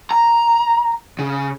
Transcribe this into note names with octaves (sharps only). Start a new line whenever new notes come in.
A#5
C#3